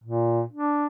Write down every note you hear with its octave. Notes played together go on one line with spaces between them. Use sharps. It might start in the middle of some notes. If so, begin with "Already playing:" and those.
A#2
D4